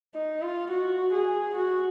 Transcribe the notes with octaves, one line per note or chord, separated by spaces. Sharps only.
D#4
F4
F#4
G#4
F#4